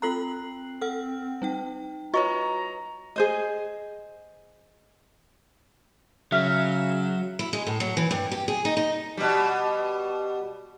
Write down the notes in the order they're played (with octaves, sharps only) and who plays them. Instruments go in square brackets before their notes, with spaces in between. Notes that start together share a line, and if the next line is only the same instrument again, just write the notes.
[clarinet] C4 [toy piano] F4 A4 A#5 [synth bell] F#6 C7 F#7
[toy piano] A4 [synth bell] F#5 F6
[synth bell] G3 D#4 G5
[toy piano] F4 D#5 C#6 [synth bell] F#4 B4 C#5 [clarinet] A#5
[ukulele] G#4 C5 D#5
[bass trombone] C#3 [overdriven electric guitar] F#3 [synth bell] E5 [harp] F6 B6
[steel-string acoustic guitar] E4
G#3
A2
F#3
E3
G2
G4
G#4
D#4
D#4
[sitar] B2 G3